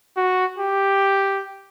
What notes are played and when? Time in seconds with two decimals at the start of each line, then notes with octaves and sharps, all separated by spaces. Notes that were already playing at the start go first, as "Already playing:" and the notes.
0.17 F#4
0.59 G4